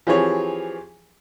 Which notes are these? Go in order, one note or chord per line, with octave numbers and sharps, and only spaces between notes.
E3 F3 C4 G4 G#4 C#5